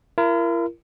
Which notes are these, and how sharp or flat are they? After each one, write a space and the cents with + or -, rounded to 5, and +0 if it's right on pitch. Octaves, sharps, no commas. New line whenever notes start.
E4 +45 A#4 +0